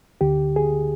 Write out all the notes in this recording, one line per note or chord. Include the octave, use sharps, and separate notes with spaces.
D2 D3 G4
G#4